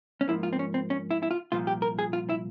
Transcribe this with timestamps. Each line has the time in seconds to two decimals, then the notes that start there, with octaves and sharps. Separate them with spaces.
0.21 C#4
0.28 G#2 F3 A#3 E4
0.43 F4
0.53 C4
0.59 C#4
0.74 C4
0.90 C#4
1.11 E4
1.23 E4
1.31 F4
1.52 C2 A#2 F3 F4
1.67 G4
1.82 A#4
1.99 G#4
2.13 F4
2.29 E4